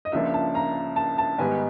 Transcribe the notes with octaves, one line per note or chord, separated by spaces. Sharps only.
D#5
C#2 C#3 F3 A#3 D4 E5
A5
A#5
A5
A5
G#2 D#3 G3 B3 G#5